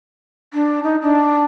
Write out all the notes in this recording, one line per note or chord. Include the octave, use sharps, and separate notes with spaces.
D4
D#4
D4